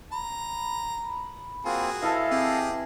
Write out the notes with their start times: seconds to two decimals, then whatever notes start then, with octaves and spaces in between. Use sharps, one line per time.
0.12 A#5 B5
1.65 A#3 C4 F4 F#4 G#4
2.02 E3 E4 A4 D#5 F5 A5
2.31 C4 G4 G#4